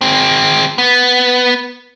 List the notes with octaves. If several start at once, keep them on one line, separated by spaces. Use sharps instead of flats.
G#3 C4
B3